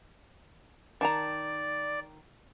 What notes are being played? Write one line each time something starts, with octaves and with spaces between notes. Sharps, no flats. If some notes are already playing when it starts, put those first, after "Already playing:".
D#3 D5 A5 A#5